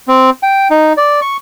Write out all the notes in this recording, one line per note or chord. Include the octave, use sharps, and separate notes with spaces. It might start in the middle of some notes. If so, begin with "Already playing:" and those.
C4
G5
D#4
D5
C#6